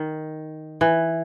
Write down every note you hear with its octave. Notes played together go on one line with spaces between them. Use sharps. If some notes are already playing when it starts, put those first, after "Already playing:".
Already playing: D#3
E3